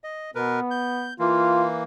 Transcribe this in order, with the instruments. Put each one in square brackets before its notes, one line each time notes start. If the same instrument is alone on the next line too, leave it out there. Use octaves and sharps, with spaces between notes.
[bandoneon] D#5
[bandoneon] B2 A#4 B4 [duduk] B3
[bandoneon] G6
[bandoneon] E3 A#3 [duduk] F4